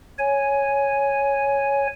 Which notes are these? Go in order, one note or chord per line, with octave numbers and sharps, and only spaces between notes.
C#5 G#5